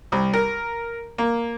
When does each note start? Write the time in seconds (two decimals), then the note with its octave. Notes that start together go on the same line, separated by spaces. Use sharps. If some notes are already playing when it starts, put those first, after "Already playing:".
0.12 C2
0.33 A#4
1.18 A#3